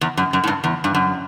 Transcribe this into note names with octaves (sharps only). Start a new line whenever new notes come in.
E2
F#2
F#2
A2
G2
E2
G2
F#2